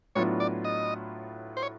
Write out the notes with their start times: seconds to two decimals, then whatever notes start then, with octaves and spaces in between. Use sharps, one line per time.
0.15 A2 F#3 B3 D4 F4 C#5
0.40 D5
0.64 D#5
1.57 C5
1.63 C#5